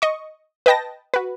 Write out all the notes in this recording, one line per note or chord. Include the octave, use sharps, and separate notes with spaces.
D#5 C#6
B4 D#5 G5 A5 A#6
F#4 B4